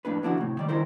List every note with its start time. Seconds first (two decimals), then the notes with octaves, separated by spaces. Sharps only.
0.05 F2 A2 D4 B4
0.23 D3 F3 D4 E4 F#4 F#5
0.37 A2 C3
0.57 D#3 G3 D5
0.69 D#3 E4 A#4 C5